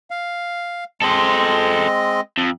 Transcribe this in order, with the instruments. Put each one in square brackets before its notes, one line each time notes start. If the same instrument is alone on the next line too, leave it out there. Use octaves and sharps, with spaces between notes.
[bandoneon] F5
[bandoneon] G#3 C4 D#5 [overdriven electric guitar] A4 C5
[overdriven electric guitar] F2